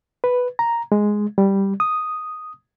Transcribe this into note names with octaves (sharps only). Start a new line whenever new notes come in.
B4
A#5
G#3
G3
D#6